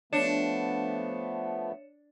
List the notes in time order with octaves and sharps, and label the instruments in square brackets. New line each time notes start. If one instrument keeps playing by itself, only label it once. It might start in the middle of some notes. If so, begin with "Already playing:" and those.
[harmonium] F3 A3 B3 [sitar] D4 [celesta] C#5 C#7 E7